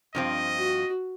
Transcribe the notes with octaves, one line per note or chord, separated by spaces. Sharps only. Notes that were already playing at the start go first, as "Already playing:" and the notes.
G2 F3 C4 D#5
F#4